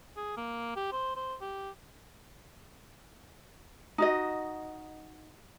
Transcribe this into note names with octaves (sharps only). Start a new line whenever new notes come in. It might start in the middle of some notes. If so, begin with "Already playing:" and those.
G#4
A#3
G4
C5
C5
G4
D#4 F#4 D#5